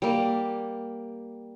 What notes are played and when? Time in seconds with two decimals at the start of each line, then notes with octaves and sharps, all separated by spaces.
0.02 G3 A#3